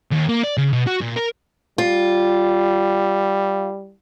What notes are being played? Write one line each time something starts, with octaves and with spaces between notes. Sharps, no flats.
D#2
A#3
D5
C#3
B2
F#4
A#2
A#4
G3 F4